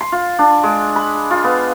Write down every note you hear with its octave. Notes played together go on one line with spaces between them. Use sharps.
C6
F4
D4
G#3
B5
F4
B3